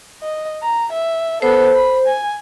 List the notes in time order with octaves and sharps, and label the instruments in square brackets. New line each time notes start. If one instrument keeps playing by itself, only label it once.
[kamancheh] D#5
A#5
E5
[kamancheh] B3 A4 [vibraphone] C5
[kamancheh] B5
G#5